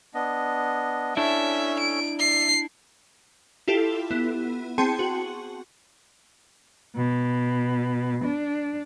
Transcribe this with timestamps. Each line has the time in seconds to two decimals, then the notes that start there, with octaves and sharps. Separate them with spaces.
0.14 B3 D4 D#5
1.17 C#4 D4 E4 A4 C#5 E5
1.79 D7
2.19 D5 E5 C7
3.68 E4 F4 G4 A4
4.11 B3 E4
4.78 C4 G#4 G5 A5 C6 C#7
4.99 F#4
6.96 B2
8.25 D4